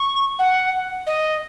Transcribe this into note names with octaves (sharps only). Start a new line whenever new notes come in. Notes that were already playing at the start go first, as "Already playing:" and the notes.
Already playing: C#6
F#5
D#5